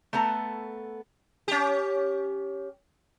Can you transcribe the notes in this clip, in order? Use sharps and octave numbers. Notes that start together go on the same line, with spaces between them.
A3 B3 A4 A#5
C#4 G4